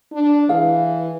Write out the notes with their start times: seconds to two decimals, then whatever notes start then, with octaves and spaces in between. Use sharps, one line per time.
0.12 D4
0.49 E3 G#4 F5